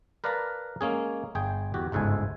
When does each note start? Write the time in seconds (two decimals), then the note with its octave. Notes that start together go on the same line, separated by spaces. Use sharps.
0.24 A#4 B4 D5 F5 A5 A#5
0.81 G#3 A#3 C#4 G#4
1.35 G1 G#4 G5
1.74 E2 F#4 G4
1.92 G1 C#2 G#2 A4 G#5